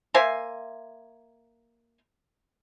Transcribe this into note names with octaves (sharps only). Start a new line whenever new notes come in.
A#3 C5 E5 G#5